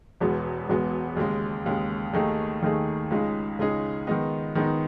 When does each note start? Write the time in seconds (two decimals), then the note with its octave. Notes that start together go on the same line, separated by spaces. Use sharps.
0.20 E1 E2 B2 G#3 B3
0.69 E1 E2 B2 G#3 B3
1.16 D#2 C#3 G#3
1.66 D#2 C#3 G#3
2.13 D#2 D#3 A3 D#4 G#4
2.62 D#2 D#3 A3 D#4 G#4
3.11 C#2 C#3 G#3 D#4 G#4
3.59 C#2 C#3 G#3 D#4 G#4
4.07 D#3 G#3 B3 D#4
4.55 D#3 G#3 B3 D#4